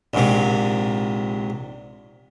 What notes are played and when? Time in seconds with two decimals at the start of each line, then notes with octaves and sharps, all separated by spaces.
0.14 A#1 G#2 C3